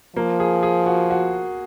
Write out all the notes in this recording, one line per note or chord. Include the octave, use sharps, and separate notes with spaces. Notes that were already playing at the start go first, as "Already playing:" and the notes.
F3 A#3
G#4
G#4
F#4
F#4